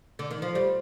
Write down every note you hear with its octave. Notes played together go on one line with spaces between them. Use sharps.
D3
D#3
F3
G3